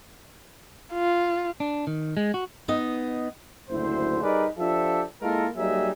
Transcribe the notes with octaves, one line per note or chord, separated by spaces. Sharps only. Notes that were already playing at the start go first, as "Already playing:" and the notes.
F4
D4
D#3
G#3
F#4
B3 D#4 D#5
F#1 D2 E4 C5
G3 D#4 G#4 A#4 B4 D5
F3 D4 F4 G4 A4 E5
G#3 A#3 E4 F4 A4 A#4
F#3 G3 A#3 D#4 G#4 E5